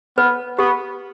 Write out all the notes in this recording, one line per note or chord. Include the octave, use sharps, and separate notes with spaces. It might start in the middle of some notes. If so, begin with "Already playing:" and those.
B3 B4
B3 G4